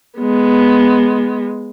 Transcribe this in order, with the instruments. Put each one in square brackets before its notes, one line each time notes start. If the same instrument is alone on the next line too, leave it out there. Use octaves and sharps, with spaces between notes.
[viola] G#3 B3